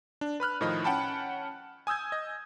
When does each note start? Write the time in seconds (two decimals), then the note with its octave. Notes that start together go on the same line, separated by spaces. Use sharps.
0.21 D4
0.40 B4 B5 F6 F#6
0.61 A2 D#3 F3 D#5 B5
0.84 C#4 F#5 G5 A5 B5
1.87 G#5 D#6 E6 G6 G#6
2.12 D#5